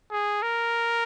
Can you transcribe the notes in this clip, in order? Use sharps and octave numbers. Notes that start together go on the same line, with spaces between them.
G#4
A#4